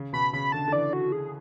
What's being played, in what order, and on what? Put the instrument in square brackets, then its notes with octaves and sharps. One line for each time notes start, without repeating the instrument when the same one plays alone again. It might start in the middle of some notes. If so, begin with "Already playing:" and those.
Already playing: [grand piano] C#3
[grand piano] B2 [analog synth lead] B5
[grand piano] C#3 [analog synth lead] B5
[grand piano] D3 [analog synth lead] A5
[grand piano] D3
[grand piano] E3 [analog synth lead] D5
[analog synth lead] F#4
G#4